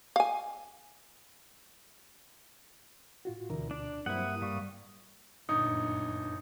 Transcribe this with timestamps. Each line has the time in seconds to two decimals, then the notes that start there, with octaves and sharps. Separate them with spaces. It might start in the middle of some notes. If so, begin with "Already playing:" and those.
0.16 F5 G#5
3.25 A2 F4 F#4
3.50 D2 B2 D3 E3 A#4
3.71 D4 D5
4.06 G2 F#3 A#3 C4 E4 C5 F#5 D#6
4.42 G#2 G3 F5 C#6
5.49 G1 F#2 A#2 C#3 D4 D#4 D#6 C#7